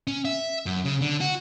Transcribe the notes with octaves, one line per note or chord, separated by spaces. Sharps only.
C#4
E5
F#2
C#3
D3
F#4